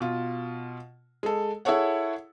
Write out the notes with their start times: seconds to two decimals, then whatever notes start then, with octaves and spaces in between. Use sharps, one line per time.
0.01 B2 F4
1.23 G#3 A4
1.65 E4 G#4 A4 C#5 F#5